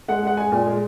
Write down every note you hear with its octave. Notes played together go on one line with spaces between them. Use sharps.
G#3 F#5
G#3 F#5
G#3 G#5
A#2
G#3